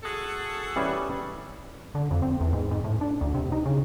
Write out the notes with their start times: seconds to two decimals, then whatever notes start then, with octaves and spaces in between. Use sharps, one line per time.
0.03 F#4 G#4 A4
0.76 E3 G3 C#4
1.95 D3
2.11 F2
2.22 C4
2.41 E2
2.53 G#2
2.71 G#2
2.84 A2
3.01 D4
3.21 D2
3.34 C3
3.52 D#4
3.66 C#3